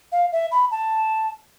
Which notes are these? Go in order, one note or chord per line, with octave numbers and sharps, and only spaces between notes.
F5
E5
B5
A5